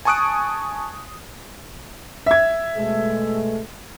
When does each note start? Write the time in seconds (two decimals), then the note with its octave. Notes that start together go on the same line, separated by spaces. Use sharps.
0.05 G#5 A5 C#6 D#6 F#6 D7
2.26 E5 G#6
2.76 B2 G#3 A3